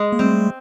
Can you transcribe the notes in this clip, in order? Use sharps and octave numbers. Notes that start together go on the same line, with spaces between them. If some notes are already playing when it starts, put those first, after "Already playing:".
Already playing: G#3
A#3
G3 A3 C4